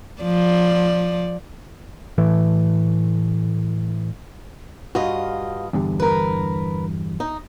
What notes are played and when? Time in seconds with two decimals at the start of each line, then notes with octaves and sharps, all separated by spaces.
0.22 F3 D5
2.18 A2 E3 A3
4.95 G2 F4 F#4 D#5
5.73 E2 G2 D3
6.00 A#4 B4
7.20 D#4